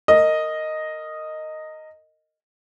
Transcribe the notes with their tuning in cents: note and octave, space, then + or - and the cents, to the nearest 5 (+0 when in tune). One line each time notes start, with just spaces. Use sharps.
A#4 -25 D#5 +0